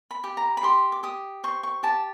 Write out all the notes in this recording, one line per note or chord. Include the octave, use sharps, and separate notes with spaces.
B5
G4
A#5
B5
G4 C6
D6
G4 D#6
C5 C#6
C#6
G4 A5